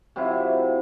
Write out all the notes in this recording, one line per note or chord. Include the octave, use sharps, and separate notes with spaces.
C3 F#3 E4 F4